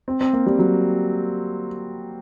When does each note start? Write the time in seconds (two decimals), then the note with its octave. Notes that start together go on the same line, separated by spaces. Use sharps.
0.08 C4
0.21 C4
0.33 A#3
0.46 G3
0.59 F#3